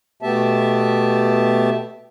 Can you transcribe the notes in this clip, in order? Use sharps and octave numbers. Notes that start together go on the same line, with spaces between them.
B2 A3 B3 G4 E5 A5